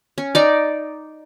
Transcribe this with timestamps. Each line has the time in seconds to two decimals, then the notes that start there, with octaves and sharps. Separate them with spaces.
0.18 C#4
0.35 D#4 D5